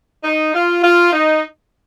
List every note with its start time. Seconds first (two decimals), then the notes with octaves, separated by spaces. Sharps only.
0.24 D#4
0.54 F4
0.83 F4
1.12 D#4